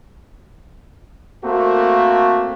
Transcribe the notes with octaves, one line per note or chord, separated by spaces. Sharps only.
A3 A#3 C4 F#4